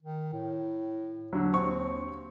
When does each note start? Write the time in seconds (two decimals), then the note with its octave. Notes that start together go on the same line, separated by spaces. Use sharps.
0.03 D#3
0.33 A2
1.33 D#2 D3 F#3
1.53 D#2 C4 C#6